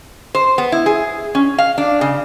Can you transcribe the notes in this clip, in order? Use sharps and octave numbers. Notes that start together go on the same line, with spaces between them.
C5
B3
E4
G#4
C#4
F5
D4
C#3